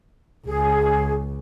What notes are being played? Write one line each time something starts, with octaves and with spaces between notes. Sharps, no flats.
C#2 G#4